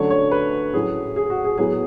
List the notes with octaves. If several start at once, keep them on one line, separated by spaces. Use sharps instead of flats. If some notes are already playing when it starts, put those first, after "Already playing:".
Already playing: D3 F#3 A3 C#4 C#5
C#5
B4
A2 F#3 C#4 G#4
G#4
F#4
G#4
A2 F#3 B3 G#4